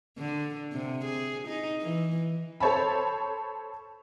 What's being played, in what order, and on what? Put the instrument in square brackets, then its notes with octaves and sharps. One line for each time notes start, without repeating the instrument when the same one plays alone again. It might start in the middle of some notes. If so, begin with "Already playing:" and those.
[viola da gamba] D3
C3
G#4
D#4
E3
[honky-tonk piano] A4 C5 C#5 A5 B5